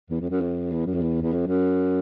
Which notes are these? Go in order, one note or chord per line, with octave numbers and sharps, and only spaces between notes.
E2
F2
F#2
F2
E2
F#2
F2
E2
E2
F2
F#2